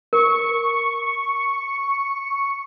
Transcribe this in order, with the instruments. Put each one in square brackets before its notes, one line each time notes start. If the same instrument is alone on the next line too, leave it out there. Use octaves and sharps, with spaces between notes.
[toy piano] A#4 [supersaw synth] C#6